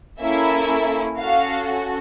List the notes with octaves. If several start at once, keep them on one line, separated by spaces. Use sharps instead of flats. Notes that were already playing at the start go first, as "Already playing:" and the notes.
A#3 C#4 E4 A4 E5
C#4 F#4 A4 F5